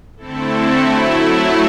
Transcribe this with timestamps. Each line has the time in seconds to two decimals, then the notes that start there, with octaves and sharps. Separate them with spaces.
0.17 D3 A3 C4 E4 A4
0.80 F#3 A3 E4